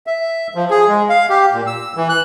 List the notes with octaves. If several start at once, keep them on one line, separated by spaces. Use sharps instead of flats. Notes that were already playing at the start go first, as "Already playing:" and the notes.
E5
F3
G#4
G#3
F5
G4
A#2
E6
E3
F#6